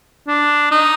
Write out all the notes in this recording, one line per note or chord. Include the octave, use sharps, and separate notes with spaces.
D4
D#4